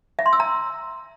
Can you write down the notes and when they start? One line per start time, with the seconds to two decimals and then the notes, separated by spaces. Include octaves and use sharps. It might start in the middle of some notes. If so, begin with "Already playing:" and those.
0.19 E5
0.26 C6
0.33 E6
0.40 A#5